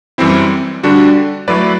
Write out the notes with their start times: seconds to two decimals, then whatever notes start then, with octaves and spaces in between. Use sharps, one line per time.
0.18 F#2 E3 G3 C4 E4
0.83 D3 G3 D4 F#4
1.48 F#3 A3 E4 B4 D5